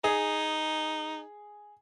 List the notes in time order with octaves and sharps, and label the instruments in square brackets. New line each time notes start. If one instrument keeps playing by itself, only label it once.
[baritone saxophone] D#4 [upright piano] G#4